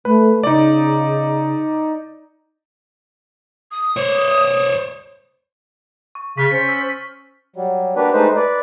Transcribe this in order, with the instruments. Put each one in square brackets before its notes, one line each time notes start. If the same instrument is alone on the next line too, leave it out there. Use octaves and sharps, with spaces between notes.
[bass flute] A3 [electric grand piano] B4
[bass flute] C#3 [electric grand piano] D#4 D5
[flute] D#6
[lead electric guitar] C5 C#5
[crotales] C#6
[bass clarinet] C#3 [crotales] C#6 F6 A6 [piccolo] B6
[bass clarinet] C#4 [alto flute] C5 [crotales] C#7
[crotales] E6
[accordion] F#3 G3
A#3 D4 F#4 G4 B4
G#3 A3 D#4 B4 C5
B4 D5